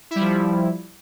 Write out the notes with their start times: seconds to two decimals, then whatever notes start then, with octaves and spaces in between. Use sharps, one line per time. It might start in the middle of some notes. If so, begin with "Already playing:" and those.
0.11 E4
0.16 G3
0.21 F3